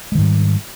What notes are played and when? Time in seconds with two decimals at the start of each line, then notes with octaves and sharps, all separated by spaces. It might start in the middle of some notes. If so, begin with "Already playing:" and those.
0.12 G#3
0.15 D#3
0.18 G#2
0.21 G3